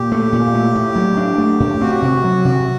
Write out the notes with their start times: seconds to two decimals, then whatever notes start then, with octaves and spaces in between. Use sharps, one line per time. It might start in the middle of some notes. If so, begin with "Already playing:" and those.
Already playing: A#2 G4
0.12 A3
0.32 A#2
0.54 A3
0.75 A2
0.96 F#3
1.17 D4
1.38 A3
1.60 A2
1.81 C4 F#4
2.02 C3
2.24 F#3
2.45 C3